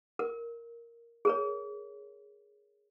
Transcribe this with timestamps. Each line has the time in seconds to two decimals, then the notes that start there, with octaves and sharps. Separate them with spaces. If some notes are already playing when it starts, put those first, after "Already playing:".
0.19 A#4
1.25 G#4 A#4 C#5